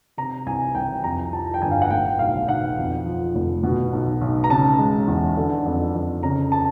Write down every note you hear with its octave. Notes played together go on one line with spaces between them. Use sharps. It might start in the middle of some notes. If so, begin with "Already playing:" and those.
C3 A#5
C2 G#5
C2 G5
F2 A#5
F3 A5
G5
G1 G#5
F5
F#5
A2 G5
B1 F5
B1 F#5
F2
F3
F1
B2
B1
B1
A#5
C#3 A5
G#3
E2
D3
F2
F2
C#3 A#5
A5